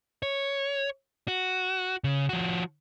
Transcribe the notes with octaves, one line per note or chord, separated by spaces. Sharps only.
C#5
F#4
C#3
F3 F#4